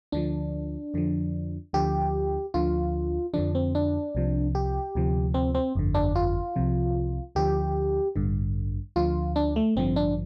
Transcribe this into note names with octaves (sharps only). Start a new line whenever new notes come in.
D2 D3 F3 D4
F2 D3 F3
D2 D3 F3 G4
D2 D3 F3 F4
F2 D3 F3 D4
C4
D4
C2 C3 F3
G4
D2 C3 F3
C4
C4
G1 F2 D3
D4
F4
C2 C3 F3
D2 D3 F3 G4
A1 G2 D3
D2 D3 F3 F4
D4
A3
A1 G2 D3 F3 C4
D4